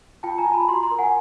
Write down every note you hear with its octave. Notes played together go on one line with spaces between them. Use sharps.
F4 G5 A5
G#5 A#5
F4
A5 B5
F#4 A#5 C6
A#5 C6
A#4
F#5 G#5